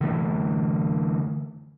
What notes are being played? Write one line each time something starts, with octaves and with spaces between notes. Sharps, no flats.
D3 E3 A3